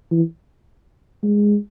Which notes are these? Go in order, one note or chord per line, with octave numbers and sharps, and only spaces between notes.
E3
G#3